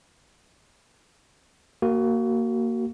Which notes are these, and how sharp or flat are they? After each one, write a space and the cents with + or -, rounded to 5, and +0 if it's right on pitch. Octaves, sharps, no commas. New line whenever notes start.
A#3 -10 F#4 +25